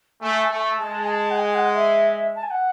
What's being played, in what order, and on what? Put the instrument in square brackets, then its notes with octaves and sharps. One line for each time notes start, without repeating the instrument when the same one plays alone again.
[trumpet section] A3 [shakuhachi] G#5
[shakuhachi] G#5
[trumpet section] A3 [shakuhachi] A5
[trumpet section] G#3 [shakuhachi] A5
[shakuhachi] G#5
A5
F#5
G#5
G#5
F#5
E5
A5
G#5
F#5